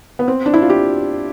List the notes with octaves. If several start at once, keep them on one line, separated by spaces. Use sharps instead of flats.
B3
C4
D4
E4
F4
G4